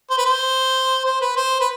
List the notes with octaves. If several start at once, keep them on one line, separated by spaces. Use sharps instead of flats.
C5
B4
C5
C5
B4
C5
B4